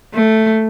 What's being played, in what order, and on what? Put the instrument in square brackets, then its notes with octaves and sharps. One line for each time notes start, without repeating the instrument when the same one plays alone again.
[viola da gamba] A3